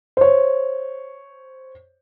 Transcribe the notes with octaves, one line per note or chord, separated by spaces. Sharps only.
C5 C#5